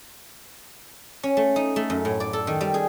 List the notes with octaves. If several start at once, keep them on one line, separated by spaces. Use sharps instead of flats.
C#4
A3
D#4
A3
F#2
A2
D5
A4
D#3
G3
G#4